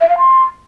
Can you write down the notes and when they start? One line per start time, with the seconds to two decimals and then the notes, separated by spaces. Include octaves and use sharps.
0.01 E5
0.09 F5
0.18 C6